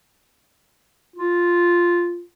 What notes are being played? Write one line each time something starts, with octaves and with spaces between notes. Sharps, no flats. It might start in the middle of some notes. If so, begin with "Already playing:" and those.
F4